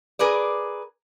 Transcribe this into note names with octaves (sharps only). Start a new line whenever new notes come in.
G#4 A#4 B4 D5